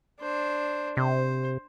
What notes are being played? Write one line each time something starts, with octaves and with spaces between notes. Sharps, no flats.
D4 C5
C3 C5